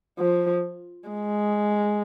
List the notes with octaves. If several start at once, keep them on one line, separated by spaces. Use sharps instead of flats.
F3
G#3